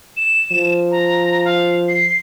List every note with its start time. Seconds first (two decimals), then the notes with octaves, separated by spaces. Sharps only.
0.17 E7
0.52 F3
0.91 A#5
1.45 F5
1.88 C7